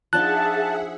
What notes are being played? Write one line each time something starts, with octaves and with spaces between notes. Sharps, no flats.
F3 D4 D#4 G#4 E5 F#5 A5 F#6